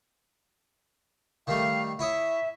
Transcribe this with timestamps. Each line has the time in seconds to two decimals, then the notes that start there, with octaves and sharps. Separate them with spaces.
1.47 D#3 G3 A3 F5
1.99 E4 C#5 E5 D#6